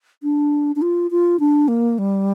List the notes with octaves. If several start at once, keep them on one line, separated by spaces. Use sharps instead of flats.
D4
D4
F4
F4
D4
A#3
G3